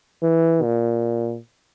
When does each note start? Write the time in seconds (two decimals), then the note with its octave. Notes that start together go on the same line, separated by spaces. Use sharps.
0.22 E3
0.63 A#2